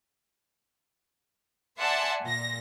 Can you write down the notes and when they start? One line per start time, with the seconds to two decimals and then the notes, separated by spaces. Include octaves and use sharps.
1.80 D5 E5 F#5 G#5 A5 C6
2.23 A#2 A#6